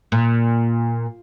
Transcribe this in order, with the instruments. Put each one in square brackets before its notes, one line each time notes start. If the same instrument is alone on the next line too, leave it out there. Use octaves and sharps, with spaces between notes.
[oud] A#2